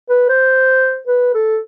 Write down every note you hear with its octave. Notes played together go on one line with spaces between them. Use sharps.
B4
C5
B4
A4